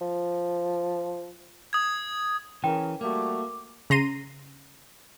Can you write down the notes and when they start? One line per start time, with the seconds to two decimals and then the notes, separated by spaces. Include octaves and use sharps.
0.01 F3
1.73 D#6 G#6
2.64 C#3 E3 A#4 G5
3.01 G3 A3 A#3 F#4 D6
3.90 C#3 A#5 C6 D#7